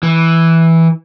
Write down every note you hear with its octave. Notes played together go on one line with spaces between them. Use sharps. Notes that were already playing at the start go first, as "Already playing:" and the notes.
E3